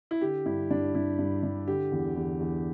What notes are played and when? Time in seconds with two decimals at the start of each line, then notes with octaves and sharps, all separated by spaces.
0.11 E4
0.21 D3 G4
0.46 G2 E4
0.70 G2 D4
0.95 G2 E4
1.19 G2
1.43 G2
1.67 D3 G4
1.92 E2
2.16 E2
2.40 E2